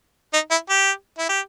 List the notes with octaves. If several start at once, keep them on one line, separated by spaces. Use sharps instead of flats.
D#4
E4
G4
E4
G4